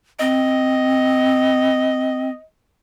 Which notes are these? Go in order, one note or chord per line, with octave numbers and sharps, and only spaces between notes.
C4 D#5